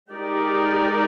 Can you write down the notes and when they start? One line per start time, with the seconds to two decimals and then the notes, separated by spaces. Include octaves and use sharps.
0.10 G#3 D#4 G4 A#4 D5